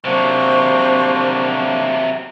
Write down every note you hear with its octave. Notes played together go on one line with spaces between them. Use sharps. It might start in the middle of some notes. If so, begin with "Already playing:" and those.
C3 F#3 A#3 D4 C5 C#6